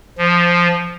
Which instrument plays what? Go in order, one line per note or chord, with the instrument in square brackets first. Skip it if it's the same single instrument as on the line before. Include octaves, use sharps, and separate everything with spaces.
[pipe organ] F3